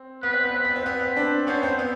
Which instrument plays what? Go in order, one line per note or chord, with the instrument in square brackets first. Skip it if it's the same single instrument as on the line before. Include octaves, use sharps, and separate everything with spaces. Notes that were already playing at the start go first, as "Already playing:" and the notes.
Already playing: [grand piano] C4
[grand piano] B3 [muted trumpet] B4
[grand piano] C4
B3
C4
B3
C4
[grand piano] B3 [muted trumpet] B4
[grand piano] C4
C4 D4
[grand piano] B3 C#4 [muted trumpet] C5
[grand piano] C4
B3